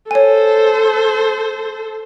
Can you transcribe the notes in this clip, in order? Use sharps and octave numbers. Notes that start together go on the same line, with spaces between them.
A4 C5 C#5 G#5